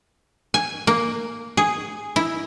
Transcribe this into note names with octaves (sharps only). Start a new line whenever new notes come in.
G#5
A#3
G#4
E4